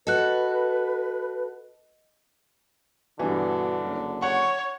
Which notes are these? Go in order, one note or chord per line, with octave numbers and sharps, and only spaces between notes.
F#4 A4 B4 D#5 F#6
G2 B2 D3 E3
F#1
C#5 F#5 C#6